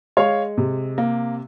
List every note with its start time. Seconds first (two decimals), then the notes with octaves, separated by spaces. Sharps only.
0.17 G#3 C#5 F5
0.58 C3
0.98 A#3